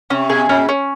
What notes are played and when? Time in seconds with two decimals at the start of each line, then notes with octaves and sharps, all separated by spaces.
0.10 C3 C#4
0.30 B2 G#4
0.49 A#2 C#4
0.69 C#4